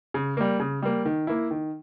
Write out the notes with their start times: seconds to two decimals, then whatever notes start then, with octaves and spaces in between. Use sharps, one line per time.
0.14 C#3
0.37 G3 A#3
0.60 C#3
0.82 G3 A#3
1.05 D#3
1.27 A#3 E4
1.51 D#3